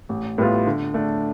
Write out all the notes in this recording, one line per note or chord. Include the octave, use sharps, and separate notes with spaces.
A1
A2 G3 B3 F4
D3
A3 D4